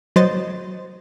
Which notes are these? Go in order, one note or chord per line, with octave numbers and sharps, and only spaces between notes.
F#3 C5 D#5 A6